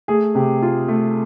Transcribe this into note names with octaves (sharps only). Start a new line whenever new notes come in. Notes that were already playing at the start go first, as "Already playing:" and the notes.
A3 G#4
C3 G4
A3 F4
A3